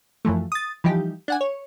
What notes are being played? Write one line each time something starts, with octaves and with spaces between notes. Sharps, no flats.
F#2 E3 F3 A3
D#6 A6
E3 F3 G3 D#4 G4
D4 F#5 G#5
C#5